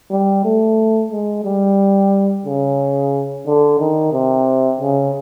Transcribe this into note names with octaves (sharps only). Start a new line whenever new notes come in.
G3
A3
G#3
G3
C#3
D3
D#3
C3
C#3